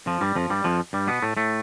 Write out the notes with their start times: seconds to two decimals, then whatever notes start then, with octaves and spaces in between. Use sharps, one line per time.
0.06 F2 F3
0.21 G2 G3
0.35 F2 F3
0.50 G2 G3
0.64 F2 F3
0.93 G2 G3
1.07 B2 B3
1.22 A2 A3
1.37 A2 A3